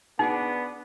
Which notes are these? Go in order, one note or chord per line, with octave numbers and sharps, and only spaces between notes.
B3 D4 D#4 F#4 G#4